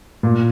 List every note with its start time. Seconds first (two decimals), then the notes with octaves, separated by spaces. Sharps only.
0.23 A#2